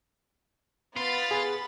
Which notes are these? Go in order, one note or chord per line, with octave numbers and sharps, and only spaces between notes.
B3 F4 B5 A6
G#4